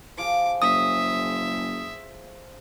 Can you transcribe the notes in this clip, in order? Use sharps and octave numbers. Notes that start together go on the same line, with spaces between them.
F3 F4 G#4 D6
F#1 E5 D#6